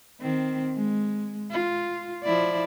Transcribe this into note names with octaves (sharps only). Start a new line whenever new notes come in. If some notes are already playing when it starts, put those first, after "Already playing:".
D#3 C4
G#3
F4
F3 E4 D5